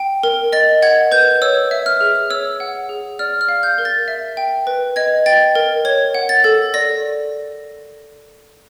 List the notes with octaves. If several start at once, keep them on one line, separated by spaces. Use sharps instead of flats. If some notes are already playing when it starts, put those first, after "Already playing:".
Already playing: G5
A#4
D#5 A6
F#5 G#6
B4 G6
C#5 E6
E5
F6
G#4
C#5 E6
F#5
G#4
D5 F6
F6
F5
G6
A#4
A6
E5
G5
B4
D#5 G#6
G5 A6
A#4
C#5 G#6
F#5
A6
A4
D5 A#6